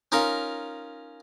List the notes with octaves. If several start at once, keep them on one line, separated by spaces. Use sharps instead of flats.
C#4 D#4 F4 A#4